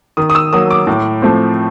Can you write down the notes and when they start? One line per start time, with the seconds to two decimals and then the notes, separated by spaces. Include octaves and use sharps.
0.17 D#3 D#6
0.30 D#6
0.35 E6
0.53 F#3 A#3 D#6
0.70 D6
0.87 A2
1.22 F3 A3 C4